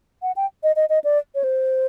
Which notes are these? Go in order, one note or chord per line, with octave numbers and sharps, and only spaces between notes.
F#5
G5
D#5
D#5
D#5
D5
C#5
C5